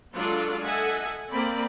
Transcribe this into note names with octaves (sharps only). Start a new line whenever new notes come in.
F#3 G#3 D4 F4 A4 D5
A4 D#5 E5 F#5 G#5
A#3 C4 D5 B5